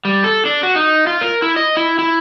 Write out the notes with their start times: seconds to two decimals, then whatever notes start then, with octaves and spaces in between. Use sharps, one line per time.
0.05 G3
0.24 A4
0.45 D4
0.63 F#4
0.76 D#4
1.07 F4
1.21 A#4
1.42 E4
1.56 D#5
1.77 E4
1.99 E4